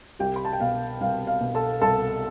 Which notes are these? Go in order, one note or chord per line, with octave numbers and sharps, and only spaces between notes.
C2 G4 G5
B5
A5
G5
B2 F5
C2 F5
F5
B2
A4 A5
C2 A4 A5